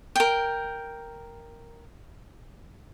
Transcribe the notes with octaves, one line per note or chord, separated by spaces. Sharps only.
A#4 G5